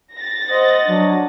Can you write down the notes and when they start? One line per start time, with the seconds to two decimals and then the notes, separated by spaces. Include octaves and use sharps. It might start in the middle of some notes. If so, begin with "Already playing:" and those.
0.15 A6 A#6
0.49 C5 D#5 F#5
0.88 F#3 D4